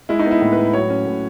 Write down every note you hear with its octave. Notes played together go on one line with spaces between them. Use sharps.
G#3 E4
D#4
B3
E4
A2
B4
A2
F#3 C#5
C#4
A2